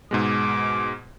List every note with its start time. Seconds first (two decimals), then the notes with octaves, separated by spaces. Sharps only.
0.11 G#2 B2 G#3 D6